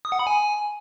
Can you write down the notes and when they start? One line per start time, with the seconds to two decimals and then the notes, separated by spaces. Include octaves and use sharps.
0.05 D#6
0.12 F#5
0.19 B5
0.27 G#5